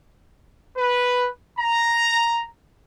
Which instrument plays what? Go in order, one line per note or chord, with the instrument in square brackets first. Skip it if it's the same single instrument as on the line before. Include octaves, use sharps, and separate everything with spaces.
[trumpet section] B4
A#5